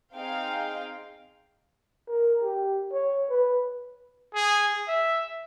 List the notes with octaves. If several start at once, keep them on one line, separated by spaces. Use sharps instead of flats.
C4 D#4 G#4 F5 G5
A#4
G4
C#5
B4
G#4
E5